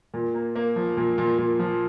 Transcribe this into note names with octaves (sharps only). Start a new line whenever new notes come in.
A#2
A#3
A#3
F3
A#2
A#2
A#2
F3